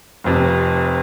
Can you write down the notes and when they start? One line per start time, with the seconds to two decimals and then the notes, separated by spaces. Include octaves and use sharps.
0.24 F1 F2 C3